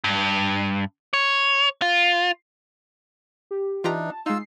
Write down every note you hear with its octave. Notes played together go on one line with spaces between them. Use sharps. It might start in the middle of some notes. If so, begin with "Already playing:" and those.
G2
C#5
F4
G4
E3 D4 D#4 F4 G4 A#5
A5
G#3 D#4 F4 E6 C7